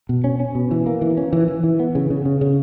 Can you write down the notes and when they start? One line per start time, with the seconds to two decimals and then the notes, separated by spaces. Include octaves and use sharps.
0.09 B2
0.24 C#4
0.40 C#4
0.55 B2
0.71 E3
0.86 A#3
1.02 E3
1.17 C#4
1.33 E3
1.48 E3
1.64 E3
1.80 B3
1.95 C#3
2.10 C#3
2.25 C#3
2.41 C#3